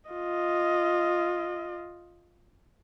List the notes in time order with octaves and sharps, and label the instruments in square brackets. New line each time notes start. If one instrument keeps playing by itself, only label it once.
[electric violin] F4 D#5